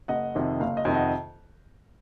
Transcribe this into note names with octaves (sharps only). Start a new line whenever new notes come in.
F#1 D#5 F#5
F2 C3 D#3
F#1 F5
D#5
F2 C3 D#3
D#5 F#5